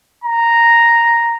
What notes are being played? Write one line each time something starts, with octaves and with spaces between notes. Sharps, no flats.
A#5